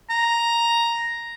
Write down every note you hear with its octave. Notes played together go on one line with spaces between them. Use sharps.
A#5